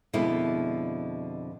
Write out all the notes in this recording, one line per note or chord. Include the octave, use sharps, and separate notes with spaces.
F2 B2 D3 G#3 A#3 E4